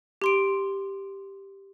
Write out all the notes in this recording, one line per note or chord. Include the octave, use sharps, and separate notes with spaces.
G4 C6 D7